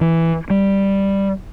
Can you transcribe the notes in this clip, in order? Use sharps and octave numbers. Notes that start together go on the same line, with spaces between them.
E3
G3